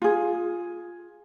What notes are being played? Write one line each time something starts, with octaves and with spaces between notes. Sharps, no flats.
F4 G#4